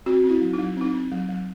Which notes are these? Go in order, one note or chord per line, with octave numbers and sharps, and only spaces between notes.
C4 F#4
C4
E4
F#3
D#4
F#3
C4 D#4
C4
F#3
F#3